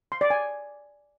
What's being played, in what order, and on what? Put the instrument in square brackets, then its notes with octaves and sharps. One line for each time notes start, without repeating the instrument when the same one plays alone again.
[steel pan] C6
D5
G#5